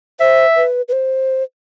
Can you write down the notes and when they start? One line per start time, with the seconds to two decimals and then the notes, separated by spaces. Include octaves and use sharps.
0.20 C5 E5
0.57 B4
0.88 B4
0.92 C5